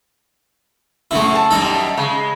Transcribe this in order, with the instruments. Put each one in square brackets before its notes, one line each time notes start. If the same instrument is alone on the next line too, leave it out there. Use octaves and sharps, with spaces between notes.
[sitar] F#2 C#3 [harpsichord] A3 E4
[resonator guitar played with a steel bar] A5
[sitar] F#2 G3 D#4 [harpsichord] A4 A#5
[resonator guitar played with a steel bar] C#3 [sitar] G#3